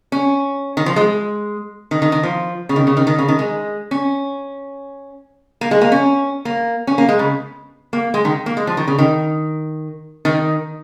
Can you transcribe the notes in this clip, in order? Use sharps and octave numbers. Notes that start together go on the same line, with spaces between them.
C#4
D#3
F3
G#3
D#3
D#3
D#3
F3
C#3
D#3
C#3
D#3
D#3
C#3
D#3
G#3
C#4
A#3
G#3
A#3
C#4
A#3
C#4
A#3
G#3
C#3
A#3
G#3
D#3
A#3
G#3
F3
D#3
C#3
D#3
D#3